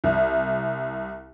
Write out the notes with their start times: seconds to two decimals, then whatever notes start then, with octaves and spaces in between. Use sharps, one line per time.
0.04 C2